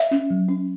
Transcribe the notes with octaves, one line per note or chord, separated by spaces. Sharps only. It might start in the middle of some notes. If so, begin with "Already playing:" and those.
Already playing: E5
C#4
F#3
C#4